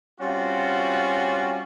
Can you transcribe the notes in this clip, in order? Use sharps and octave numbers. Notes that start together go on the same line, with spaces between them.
G3 C4 C#4 F4 F#4